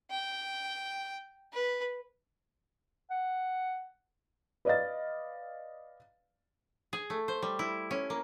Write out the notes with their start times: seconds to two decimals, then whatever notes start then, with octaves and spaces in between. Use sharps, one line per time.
0.11 G5
1.53 B4
3.10 F#5
4.65 B4 D5 D#5 F5 A6
6.93 G#4
7.10 A3
7.28 C5
7.42 G3
7.59 E4
7.91 C#4
8.10 A#3